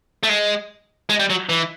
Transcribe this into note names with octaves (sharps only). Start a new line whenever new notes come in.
A3
G#3
G#3
G3
F#3
E3